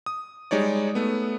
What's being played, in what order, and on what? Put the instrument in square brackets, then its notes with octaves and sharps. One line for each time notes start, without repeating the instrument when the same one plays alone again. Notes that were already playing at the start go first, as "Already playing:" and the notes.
[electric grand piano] D#6
G3 G#3 D#4 C#5 D5
A3 B3